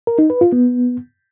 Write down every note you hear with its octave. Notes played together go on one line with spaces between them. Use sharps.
A#4
D#4
B4
F4
B3